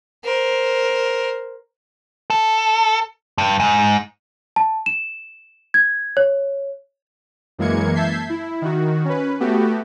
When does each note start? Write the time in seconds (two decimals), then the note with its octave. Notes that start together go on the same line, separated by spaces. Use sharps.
0.24 A#4 C5
2.30 A4
3.38 G2
3.60 G#2
4.56 A5
4.86 E7
5.74 G#6
6.17 C#5
7.58 F#2 E3 G#3 A#3 G#6 C#7
7.95 E5 A5 G6 G#6 B6 C7
8.30 E4
8.62 D#3 F#4
9.05 C#4 B4
9.40 A3 B3 F#4 G4